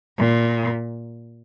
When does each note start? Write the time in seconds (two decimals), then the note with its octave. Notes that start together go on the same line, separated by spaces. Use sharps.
0.19 A#2